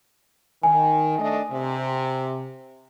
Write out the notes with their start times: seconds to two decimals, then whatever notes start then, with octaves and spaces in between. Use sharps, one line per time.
0.63 D#3 G#5
1.18 A3 D4 D#5
1.52 C3